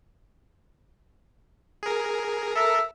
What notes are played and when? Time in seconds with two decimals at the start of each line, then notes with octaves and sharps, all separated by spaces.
1.83 G#4 A#4
2.55 A4 A#4 E5